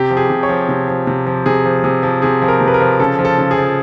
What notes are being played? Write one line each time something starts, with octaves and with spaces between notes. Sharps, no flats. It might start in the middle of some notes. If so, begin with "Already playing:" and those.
Already playing: C3 G4
F3
G#4
C3
C#5
F3
C3
F3
C3
F3
C3 G#4
F3
C3 G#4
F3
C3 G#4
F3
A#4
C3
B4
A#4
F3
C#3 A4
F3
A4
C#3
G#4
F3